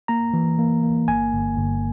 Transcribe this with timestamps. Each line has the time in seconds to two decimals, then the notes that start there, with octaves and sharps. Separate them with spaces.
0.08 A#3 A#5
0.34 E3
0.59 A#3
0.83 A#3
1.08 G1 G#5
1.33 G1
1.58 G1